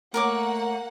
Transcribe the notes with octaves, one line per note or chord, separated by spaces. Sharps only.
A3 A#3 A#4 C#5 F#5 D6